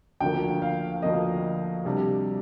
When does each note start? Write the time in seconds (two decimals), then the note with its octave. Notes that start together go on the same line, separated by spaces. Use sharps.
0.20 D2 D3 F3 A#3 G5
0.62 F5
1.02 D2 D3 F3 A#3 D#5
1.85 C3 G3 D4